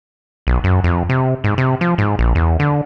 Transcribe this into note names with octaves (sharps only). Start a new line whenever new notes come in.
B1
F#2
F2
C3
G#2
C3
F3
G#2
A#1
E2
D3